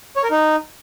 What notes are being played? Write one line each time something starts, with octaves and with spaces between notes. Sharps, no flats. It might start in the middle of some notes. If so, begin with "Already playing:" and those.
C#5
A#4
D#4